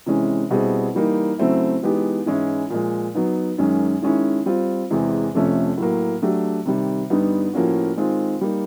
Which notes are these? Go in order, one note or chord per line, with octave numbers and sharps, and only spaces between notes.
C3 E3 G#3 C#4
B2 G3 C4 E4 G#4
E3 G3 A#3 D#4
C#3 F#3 A3 C4 E4
E3 G#3 B3 D#4 G4
G#2 E3 G#3 C#4 E4
A#2 F3 G#3
F#3 B3 D#4
F#2 D#3 G#3 C#4
D#3 G#3 C#4 E4
G3 C4 F4
E2 C3 E3 G#3
F2 C3 F3 A3 C#4
A2 F#3 A#3
F#3 A3 D4 G4
C3 D#3 G3
G2 D3 G3 B3 D#4
A2 F3 A#3 C#4 F#4
D#3 G#3 C4 F4
G3 A#3 D#4